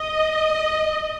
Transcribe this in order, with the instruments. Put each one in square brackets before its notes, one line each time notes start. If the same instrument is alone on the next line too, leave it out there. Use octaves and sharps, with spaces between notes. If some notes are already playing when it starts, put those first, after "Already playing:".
Already playing: [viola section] D#5